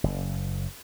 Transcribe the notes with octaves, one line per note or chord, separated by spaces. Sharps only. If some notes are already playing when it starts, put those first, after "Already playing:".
F#1